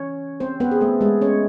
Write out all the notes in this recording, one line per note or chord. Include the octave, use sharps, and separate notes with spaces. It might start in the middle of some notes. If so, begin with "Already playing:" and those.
Already playing: E3 C#4 C#5
C4 C5
B3 B4
G#4
A3 A4
G#3 G#4
C#4 C#5